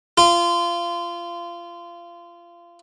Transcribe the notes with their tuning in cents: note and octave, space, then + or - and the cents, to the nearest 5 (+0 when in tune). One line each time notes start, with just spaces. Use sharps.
F4 -25